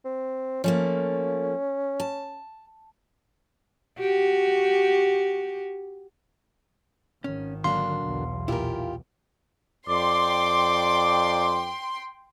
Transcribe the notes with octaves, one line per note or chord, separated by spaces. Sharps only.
C4
F3 A3 A#3 C#4
A5
F#4 G4
G#1 D#3 C#4
D3 F#3 A#3 D4 F5 C6
B1 E2
A#2 E4 F4 G4 A#4
F2 D5 G5 C6 D6